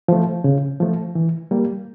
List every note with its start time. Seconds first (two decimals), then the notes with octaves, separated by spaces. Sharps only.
0.08 F3 A3
0.44 C#3
0.80 F3 A3
1.15 E3
1.51 G3 A#3